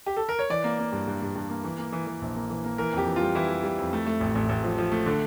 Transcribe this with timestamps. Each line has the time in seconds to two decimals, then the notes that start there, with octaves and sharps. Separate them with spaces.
0.06 G4
0.17 A4
0.29 A#4
0.39 C#5
0.50 E3 D5
0.64 A#3
0.79 A#3
0.92 G2
1.07 G2
1.22 G2
1.36 G2
1.49 A#3
1.64 E3
1.78 A#3
1.93 E3
2.07 E3
2.22 A#1
2.36 A#3
2.50 E3
2.64 A#3
2.78 E3 A#4
2.93 F2 G4
3.07 E3
3.16 G3 F4
3.35 E3 E4
3.49 G3
3.63 G3
3.79 F2
3.93 A3
4.06 A3
4.21 A1
4.35 A1
4.49 A1
4.64 F3
4.78 F3
4.92 A3
5.06 D3